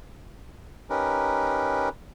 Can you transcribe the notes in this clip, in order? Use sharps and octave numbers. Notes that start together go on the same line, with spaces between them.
C#4 D#4 G4 A#4 B4